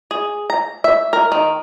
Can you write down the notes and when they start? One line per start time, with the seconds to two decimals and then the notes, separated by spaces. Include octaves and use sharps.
0.11 G#4
0.50 A#5
0.84 E5
1.13 A#4
1.32 D#3